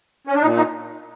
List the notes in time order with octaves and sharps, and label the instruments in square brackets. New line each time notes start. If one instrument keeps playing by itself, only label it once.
[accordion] C#4
D4
A#2 D#4
D#4